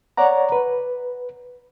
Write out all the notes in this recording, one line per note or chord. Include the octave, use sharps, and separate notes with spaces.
C#5 D5 F#5 A#5
B4